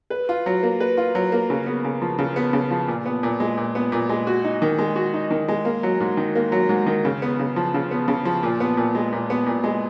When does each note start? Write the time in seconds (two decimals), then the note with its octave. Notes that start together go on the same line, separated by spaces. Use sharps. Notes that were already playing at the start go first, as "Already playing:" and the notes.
0.10 B4
0.29 F4
0.46 F#3
0.63 A#3
0.80 B4
0.97 F4
1.15 F#3
1.32 A#3
1.50 C#3
1.66 B3
1.84 C#3
2.02 F3
2.18 C#3
2.36 B3
2.53 C#3
2.71 F3
2.88 A#2
3.06 B3
3.23 A#2
3.40 G#3
3.58 A#2
3.75 B3
3.92 A#2
4.09 G#3
4.27 F#4
4.45 D#4
4.62 D#3
4.78 G#3
4.96 F#4
5.14 D#4
5.30 D#3
5.48 G#3
5.65 A#3
5.83 F#3
6.00 G#2
6.17 D#3
6.35 A#3
6.52 F#3
6.69 G#2
6.86 D#3
7.05 C#3
7.22 B3
7.39 C#3
7.56 F3
7.74 C#3
7.91 B3
8.08 C#3
8.25 F3
8.43 A#2
8.60 B3
8.77 A#2
8.95 G#3
9.12 A#2
9.30 B3
9.46 A#2
9.64 G#3